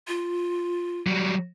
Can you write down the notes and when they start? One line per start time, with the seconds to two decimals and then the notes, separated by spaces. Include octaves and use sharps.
0.08 F4
1.07 F#3 G3